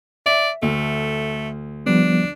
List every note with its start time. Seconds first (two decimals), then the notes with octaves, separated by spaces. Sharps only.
0.26 D5 E5
0.62 D2 A3
1.86 F3 G3 B3 D4